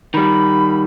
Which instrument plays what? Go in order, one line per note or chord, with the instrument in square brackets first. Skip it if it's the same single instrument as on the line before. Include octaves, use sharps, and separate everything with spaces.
[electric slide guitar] D#3 G3 [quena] B5